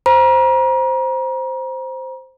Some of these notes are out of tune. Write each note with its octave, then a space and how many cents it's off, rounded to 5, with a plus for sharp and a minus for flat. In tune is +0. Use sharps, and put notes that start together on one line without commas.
C5 +0 A#5 +35